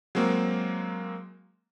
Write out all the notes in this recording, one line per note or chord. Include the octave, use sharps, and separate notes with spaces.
F#3 G#3 A#3 C4